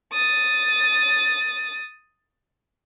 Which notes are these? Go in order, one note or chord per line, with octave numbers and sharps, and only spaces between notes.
D#6 A6